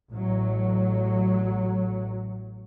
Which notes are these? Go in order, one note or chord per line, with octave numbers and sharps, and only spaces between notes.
A1 F#3